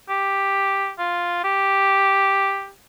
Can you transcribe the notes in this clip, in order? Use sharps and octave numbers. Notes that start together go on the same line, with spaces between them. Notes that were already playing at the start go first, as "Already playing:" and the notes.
G4
F4
G4